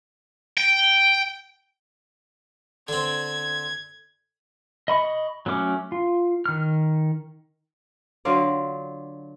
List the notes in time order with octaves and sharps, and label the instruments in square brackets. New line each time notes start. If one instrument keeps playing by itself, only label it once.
[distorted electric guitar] G5
[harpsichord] D3 C4 [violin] G#6
[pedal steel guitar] D#5 B5 C#6
F#3 A3 C#4 D6
F4
D#3 F6
[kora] D3 F#3 F4 D5